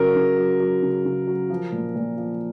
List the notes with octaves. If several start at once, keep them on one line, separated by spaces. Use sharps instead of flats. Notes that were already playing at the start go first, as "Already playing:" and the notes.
Already playing: C#3 F#3 A#4
C#3
F#3
F#3
C#3
C#3
F#3
F3
A#2
A#2
F3